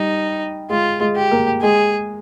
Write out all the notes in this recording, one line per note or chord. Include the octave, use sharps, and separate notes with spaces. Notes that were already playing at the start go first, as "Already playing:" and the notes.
Already playing: G3 D#4
G#3 F4
G#3
G4
A#3
G#3 G#4